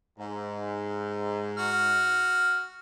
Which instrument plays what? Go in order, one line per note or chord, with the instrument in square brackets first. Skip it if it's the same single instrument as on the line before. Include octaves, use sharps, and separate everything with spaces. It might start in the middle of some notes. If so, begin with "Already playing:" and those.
[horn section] G#2
[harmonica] F#4 F6